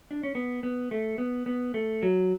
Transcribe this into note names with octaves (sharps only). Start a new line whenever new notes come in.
D4
C#4
B3
B3
A3
B3
B3
A3
F#3